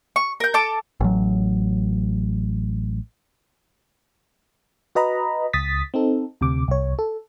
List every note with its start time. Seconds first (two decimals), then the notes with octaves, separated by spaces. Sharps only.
0.16 C#6
0.40 A#4 G6
0.54 A4 A5 D6
1.01 A1 F#3
4.95 F#4 B4 D#5 A#5 B5
5.53 C#2 D#6 A6 B6
5.94 C4 D#4 A4
6.41 D2 C3 D6
6.68 C2 C#5
6.99 A4